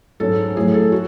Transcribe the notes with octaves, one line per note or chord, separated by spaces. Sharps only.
G#2 F#3 C#4 A4
A2 F#3 A3 G#4
A4
F#4